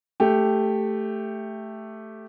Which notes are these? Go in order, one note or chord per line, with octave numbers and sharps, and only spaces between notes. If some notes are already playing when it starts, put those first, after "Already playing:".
A3 G4